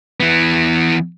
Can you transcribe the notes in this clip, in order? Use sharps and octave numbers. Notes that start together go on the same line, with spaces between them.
E3 B3